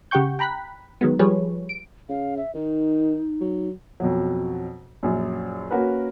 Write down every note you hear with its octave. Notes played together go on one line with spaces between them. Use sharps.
C#3 G4 F#5 G5 C#6 G6
G5 A#5 B5 F#6 B6
D#3 F#3 G#3 B3
F3 G3 G4 G#4 B4 C#5
D7
C#3 F5
E5
D#3 D#4
F#3
F2 B2 F#3
A#1 F#2
A#3 C#4 F#4 A#4 B4